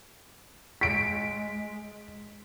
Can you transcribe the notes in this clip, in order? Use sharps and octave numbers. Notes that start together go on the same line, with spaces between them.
G#3 B6 D7